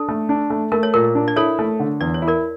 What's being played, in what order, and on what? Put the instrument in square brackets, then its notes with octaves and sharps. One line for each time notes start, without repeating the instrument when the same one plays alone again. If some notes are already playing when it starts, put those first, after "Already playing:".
Already playing: [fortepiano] D4 [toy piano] A4
[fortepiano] A3
D4
A3
[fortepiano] A3 [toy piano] A#4
[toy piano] C#5
[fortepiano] A#2 [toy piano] A#4
[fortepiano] D4
[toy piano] D5
[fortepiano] E4 [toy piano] A4 C#5
[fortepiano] A3
D3
[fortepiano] E2 [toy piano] D5
[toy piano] C#5
[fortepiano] E4
[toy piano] A#4 D5